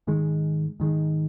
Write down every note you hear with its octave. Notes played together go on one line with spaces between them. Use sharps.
G#2 D#3 G#3
G#2 D#3 G#3